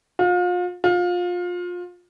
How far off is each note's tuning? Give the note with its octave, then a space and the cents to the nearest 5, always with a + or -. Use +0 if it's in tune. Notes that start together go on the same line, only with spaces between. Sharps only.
F4 +35
F4 +25